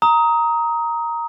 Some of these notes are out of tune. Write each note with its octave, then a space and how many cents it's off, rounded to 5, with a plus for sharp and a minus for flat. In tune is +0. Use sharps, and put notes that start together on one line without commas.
A#5 +0 D#6 +20